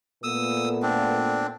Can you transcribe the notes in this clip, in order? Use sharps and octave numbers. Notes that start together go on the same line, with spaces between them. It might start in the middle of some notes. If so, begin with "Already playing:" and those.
A#2 A3 B3 D#6 E6
C4 D4